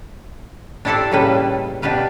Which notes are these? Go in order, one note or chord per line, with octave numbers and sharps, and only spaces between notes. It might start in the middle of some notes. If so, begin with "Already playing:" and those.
D4 E4 G4 A4 C5 D5
A2 C#3 G3 A#3 B4 D#5
B2 D4 G4 B4 F5